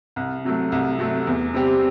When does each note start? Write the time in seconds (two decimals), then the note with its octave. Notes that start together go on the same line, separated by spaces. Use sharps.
0.16 C2
0.45 C3 F#3 A3
0.72 C2
0.99 C3 F#3 A3
1.27 E2
1.54 C3 G3 C4 G4